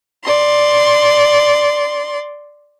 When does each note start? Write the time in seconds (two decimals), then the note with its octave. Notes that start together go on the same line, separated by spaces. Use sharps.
0.25 D5 C6